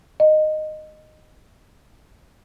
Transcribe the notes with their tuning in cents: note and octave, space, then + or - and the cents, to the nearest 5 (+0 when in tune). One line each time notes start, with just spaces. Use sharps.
D#5 -10